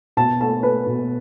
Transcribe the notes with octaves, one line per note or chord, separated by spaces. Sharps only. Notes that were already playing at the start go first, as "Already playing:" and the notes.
B2 A5
A3 A5
A3 B4
B2